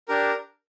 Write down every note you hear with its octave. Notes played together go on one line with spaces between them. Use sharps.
D4 G4 A#4